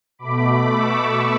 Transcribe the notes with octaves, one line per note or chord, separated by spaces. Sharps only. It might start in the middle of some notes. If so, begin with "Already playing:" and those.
B2 A3 B5 D6
C#6 E6